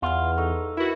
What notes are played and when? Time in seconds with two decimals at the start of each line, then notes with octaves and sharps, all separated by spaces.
0.02 E2 F4 E5 F#5 F6
0.38 D#4 A4 C#6 E6
0.77 E4 F#4 A#4 B4 E5